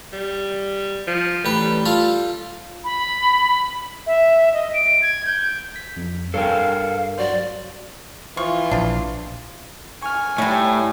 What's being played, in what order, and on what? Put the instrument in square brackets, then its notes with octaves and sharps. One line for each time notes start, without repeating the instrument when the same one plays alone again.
[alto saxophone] G3
F3
[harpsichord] A1 B4 [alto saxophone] G4
[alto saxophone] G3
[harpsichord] F4 A4 F5
[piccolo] B5
E5
D#5
D7
G#6
G6
[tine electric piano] B6
F2
[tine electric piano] G2 C#5 C7 [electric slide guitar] A4 A#4 G5 [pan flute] F5
[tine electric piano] F#3 F#4 C5 [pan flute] D5
[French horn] E3 [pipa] F3 C#6 [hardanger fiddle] F4
[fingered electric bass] A#1 [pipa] F3 D4
[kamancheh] G#5 [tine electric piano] C#6 F6
[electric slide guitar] A2 [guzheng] G3 D#4 [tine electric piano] C#5 C#6